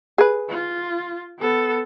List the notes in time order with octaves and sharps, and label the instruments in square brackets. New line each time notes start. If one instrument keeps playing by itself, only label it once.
[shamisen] G#4 B4
[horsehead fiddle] F4
B3 A4